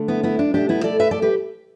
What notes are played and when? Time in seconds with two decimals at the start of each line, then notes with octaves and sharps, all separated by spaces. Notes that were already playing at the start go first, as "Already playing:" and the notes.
Already playing: D3 A3
0.08 B3 E4
0.23 B3 E4
0.39 D4
0.54 B2 A3 D4 G4
0.69 B3 E4
0.84 A4 D5
1.00 B4 E5
1.11 A4 D5
1.22 G4 B4